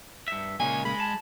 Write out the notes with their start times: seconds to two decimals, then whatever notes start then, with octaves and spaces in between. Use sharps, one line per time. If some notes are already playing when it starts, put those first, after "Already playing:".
0.28 G2 E5
0.60 A#2 C#3 G#3 C#5 G#5
0.85 G#3 B5
1.00 A5